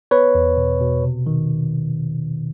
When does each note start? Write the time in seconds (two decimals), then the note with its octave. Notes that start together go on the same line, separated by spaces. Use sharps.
0.11 B3 B4 C#5
0.35 E2
0.57 B2
0.81 B2
1.04 C3
1.27 D#3